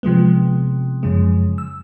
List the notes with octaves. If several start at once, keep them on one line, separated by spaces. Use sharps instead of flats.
C3 F3 G#3 B3
F#2 C#3 F3 G#3
E6